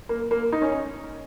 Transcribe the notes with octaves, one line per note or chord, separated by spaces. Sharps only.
A#3
A#3
D#4
C#4